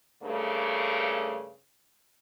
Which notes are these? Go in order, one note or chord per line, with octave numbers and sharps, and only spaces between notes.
G2 C#3 A3 A#3